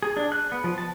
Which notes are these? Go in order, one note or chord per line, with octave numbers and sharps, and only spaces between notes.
G#4
D4
F#6
B3
F3
A5